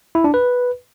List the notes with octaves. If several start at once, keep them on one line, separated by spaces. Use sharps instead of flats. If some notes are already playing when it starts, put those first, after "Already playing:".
E4
D4
B4